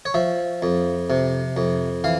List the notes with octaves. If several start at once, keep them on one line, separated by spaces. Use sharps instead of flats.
C#5
F3 E5
F2
C3
F2
E3 F5